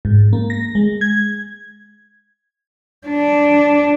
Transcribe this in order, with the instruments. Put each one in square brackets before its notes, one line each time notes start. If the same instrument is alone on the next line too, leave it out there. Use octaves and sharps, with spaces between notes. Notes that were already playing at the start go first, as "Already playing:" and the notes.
[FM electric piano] G#2
A#3
A#6
G#3
G#6
[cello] D4